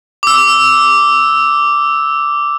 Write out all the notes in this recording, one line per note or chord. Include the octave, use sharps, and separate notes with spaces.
D6 E6